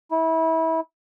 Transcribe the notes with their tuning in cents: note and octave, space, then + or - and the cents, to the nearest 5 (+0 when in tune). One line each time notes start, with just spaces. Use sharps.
E4 -25